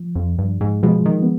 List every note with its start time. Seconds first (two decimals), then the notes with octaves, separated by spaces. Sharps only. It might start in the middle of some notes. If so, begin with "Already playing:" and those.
Already playing: F3
0.16 F2
0.38 G2
0.61 G#2
0.83 B2 F3 G#3
1.06 D#3
1.22 B3